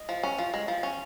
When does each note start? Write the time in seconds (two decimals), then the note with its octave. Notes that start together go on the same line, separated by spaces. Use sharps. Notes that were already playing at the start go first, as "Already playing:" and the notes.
Already playing: D#5
0.09 F3
0.23 C#4
0.38 F3
0.54 G#3
0.68 F3
0.83 C#4